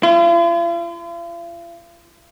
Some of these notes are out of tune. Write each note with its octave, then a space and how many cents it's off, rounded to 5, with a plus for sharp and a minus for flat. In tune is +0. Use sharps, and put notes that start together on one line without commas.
F4 -45